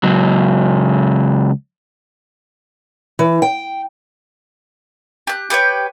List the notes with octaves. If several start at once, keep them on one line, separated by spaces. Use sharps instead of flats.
C#2 F#3
E3
G5
G4 F#6
G4 B4 C#5 G5